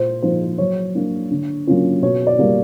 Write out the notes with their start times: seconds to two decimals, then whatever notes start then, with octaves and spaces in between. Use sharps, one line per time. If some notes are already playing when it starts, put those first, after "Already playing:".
Already playing: A#2 C5
0.22 F3 A#3 D#4 C5
0.58 F#3 C#5
0.95 A#3 D4
1.31 D3
1.67 F#3 A#3 C#4 F4
2.02 B2 C#5
2.27 D5
2.39 G3 A#3